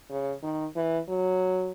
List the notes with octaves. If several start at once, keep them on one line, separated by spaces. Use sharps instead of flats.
C#3
D#3
E3
F#3